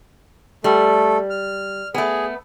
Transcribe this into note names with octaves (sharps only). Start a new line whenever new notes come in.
G3 A3 A4
F6
A3 B3 G#4